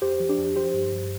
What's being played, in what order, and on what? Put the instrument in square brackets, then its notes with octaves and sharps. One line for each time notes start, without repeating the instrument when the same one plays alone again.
[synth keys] F2 G4 C5
F3
D4 G4
F2
F3 G4 C5
G2
G2